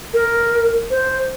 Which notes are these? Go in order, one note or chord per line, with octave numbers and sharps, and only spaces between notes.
A#4
C5